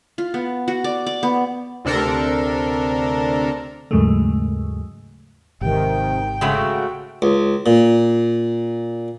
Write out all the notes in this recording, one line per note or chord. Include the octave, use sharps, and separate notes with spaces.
F4
B3
F#4
D5
D5
B3
D2 C3 D4 A4 A#4
D#2 G#2 C#3 F#3 G#3 A3
G#1 C3 D#3 G5
C#3 G#3 A3 F#4
C#2
A#2